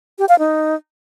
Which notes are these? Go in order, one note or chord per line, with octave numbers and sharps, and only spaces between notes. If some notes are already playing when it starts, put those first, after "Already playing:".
G4
F5
D#4